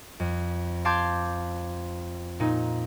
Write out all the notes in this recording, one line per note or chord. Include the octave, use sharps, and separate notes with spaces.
F2
F5 A5 C6 D6 G6 G#6
A#2 D#4